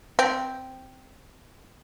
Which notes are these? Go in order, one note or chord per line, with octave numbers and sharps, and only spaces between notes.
C4